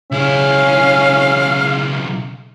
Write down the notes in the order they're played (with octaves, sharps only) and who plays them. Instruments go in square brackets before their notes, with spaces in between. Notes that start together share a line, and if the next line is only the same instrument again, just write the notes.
[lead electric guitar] B1 E4 [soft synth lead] C#3 [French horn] C#4 [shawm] F5